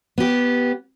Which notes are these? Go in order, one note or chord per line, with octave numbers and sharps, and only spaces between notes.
B3 G4